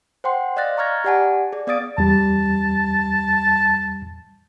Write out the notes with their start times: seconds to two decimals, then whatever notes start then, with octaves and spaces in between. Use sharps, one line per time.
0.24 C5 F#5 G5 C6
0.57 D5 D#5 F5 F#6 A6 A#6
0.78 A#5 C#6 F6 G#6 A#6
1.04 G4 D5 F#5 G#5 A5
1.52 G#4 D5
1.67 B3 D5 F5 D#6 A6 D7
1.98 E2 G3 A5